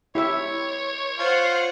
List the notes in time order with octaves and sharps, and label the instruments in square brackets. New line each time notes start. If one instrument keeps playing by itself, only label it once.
[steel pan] E4 G4 E5 [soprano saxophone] C#5
[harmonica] F4 [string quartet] C5 F#5